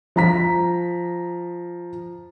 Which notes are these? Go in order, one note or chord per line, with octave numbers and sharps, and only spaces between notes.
F3 A#5 B6